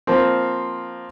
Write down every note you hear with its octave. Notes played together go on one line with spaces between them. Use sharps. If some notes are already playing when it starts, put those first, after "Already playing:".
F3 A#3 C4